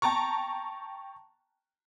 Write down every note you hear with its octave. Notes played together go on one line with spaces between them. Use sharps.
G5 A5 A#5 C#6